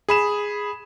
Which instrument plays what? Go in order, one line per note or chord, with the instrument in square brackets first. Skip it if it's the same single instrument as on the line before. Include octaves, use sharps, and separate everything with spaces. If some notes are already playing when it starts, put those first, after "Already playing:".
[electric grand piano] G#4 B5 E7